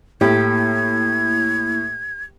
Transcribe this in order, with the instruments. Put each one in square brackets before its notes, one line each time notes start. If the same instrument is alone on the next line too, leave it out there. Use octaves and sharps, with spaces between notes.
[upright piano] A2 [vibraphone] A#3 E4 [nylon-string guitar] G4 [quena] G#6